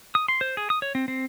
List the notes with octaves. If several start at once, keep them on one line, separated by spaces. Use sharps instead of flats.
D#6
C6
C5
G#4
D#6
C#5
C4
C4